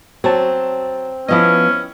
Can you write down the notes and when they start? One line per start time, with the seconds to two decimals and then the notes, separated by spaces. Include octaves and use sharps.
0.24 F#3 C4 C#5 A5
1.29 F3 B3 C#4 E4 D#5